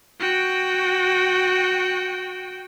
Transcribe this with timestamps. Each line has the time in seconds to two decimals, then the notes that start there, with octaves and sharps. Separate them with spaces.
0.20 F#4 G5